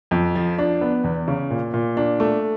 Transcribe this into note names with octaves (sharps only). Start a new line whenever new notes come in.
F2
F3
D4
B3
E2
C#3
A#2
A#2
D4
A3